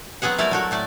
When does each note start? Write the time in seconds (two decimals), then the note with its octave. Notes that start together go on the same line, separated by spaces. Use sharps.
0.22 F#3 B3 C4 G#4 F#5
0.38 G3 A3 E4 A#4 D5
0.51 F#3 A3 F#4
0.71 A2 A3 D5